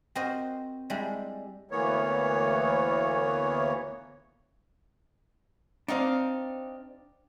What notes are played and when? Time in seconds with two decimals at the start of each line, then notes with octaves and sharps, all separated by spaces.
0.15 C4 F#4 A#4 C5 D#5
0.90 G3 G#3 D4 E4
1.71 D2 E3 A#3 B3 C#5
5.88 C4 D4 D#4 G4 F5